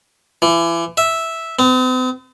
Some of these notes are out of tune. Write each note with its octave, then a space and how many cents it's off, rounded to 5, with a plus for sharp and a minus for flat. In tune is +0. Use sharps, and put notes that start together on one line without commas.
E3 +30
E5 -5
C4 -45